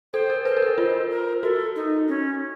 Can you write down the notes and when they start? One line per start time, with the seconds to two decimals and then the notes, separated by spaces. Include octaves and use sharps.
0.13 A4 C5
0.30 A#4
0.45 B4 C5
0.57 A#4
0.62 A4
0.78 F4 C5
1.11 A#4
1.43 F#4 A4
1.76 D#4
2.08 C#4